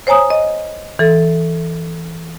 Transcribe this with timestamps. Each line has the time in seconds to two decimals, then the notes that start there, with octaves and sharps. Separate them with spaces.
0.07 C5 C#5 G#5 A#5 D#6
0.30 D#5
0.99 E3 A4